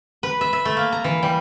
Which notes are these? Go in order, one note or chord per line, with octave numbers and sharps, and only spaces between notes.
B4
E5
E5
A3
A#3
A#5
E3
G3